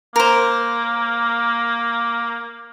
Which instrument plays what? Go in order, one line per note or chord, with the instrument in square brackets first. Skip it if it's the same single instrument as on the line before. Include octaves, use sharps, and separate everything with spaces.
[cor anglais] A#3 [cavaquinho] A#4 C5